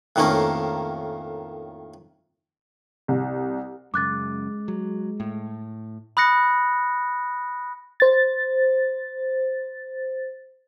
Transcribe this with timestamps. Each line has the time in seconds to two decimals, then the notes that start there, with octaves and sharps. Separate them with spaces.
0.16 F2 A2 D#3 A#3 C#4
3.08 C2
3.94 F#2 C#3 G#3 D6 F#6 A6
4.68 F#3
5.20 A2
6.17 B5 D#6 F#6 A#6 C#7
8.00 C5 A6